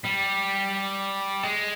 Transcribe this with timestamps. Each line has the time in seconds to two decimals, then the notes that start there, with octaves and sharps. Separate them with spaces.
0.04 G3
1.43 G#3